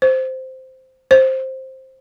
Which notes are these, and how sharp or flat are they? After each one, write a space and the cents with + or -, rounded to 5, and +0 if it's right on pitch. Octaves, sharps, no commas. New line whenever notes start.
C5 -5
C5 +10